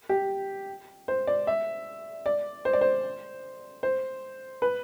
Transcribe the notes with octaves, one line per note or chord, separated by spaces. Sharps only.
G4
C5
D5
E5
D5
C5
D5
C5
C5
B4